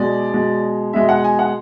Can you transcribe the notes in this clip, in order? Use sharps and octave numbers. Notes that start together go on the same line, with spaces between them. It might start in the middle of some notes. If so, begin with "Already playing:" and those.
Already playing: B2 G#3 D5
B2 G#3
B2 G#3 E5
F#5
G#5
F#5